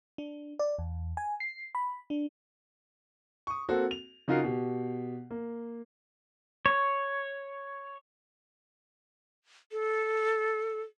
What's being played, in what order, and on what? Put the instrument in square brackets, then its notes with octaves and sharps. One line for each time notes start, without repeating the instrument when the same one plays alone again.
[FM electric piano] D4
D5
E2
G#5
C7
B5
D4
[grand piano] C#6 D#6
A#3 C4 F#4 A4
F7
C#3 D#4 F4 F#4 A#4 C7
B2 G4
A#3
[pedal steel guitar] C#5
[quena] A4